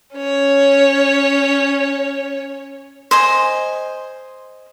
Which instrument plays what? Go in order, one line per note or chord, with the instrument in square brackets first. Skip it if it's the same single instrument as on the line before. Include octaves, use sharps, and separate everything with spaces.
[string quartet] C#4 C#5
[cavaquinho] C5 D#5 G#5